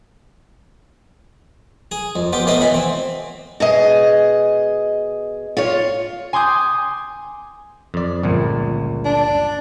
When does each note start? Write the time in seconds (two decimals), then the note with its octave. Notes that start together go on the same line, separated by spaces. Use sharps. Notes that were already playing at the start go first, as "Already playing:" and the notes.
1.92 G#4 D#6
2.16 F2
2.33 B3 F4 G4
2.47 A2 A3 B3 D#5 C6 D#6
2.61 E3 B5
2.74 C4
3.60 B2 G#4 D#5
5.57 F4 C#5
6.33 G#5 C6 D6 D#6 G6
7.94 F2 D5
8.23 G1 C#2 A#2
9.05 D4